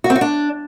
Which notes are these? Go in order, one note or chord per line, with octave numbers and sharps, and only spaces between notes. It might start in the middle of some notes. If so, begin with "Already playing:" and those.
F#4
C4
F#4
D4